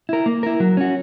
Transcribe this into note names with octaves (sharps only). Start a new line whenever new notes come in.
E4 A#4
A#3
E4 A#4
F#3
C#4 F#4